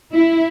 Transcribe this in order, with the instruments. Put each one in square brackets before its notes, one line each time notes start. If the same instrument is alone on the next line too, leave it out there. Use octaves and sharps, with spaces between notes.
[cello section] E4